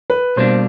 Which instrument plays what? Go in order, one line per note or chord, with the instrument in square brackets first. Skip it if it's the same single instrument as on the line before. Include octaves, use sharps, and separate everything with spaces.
[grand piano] B4
[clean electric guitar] B2 G3 A#3 D4 [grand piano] C5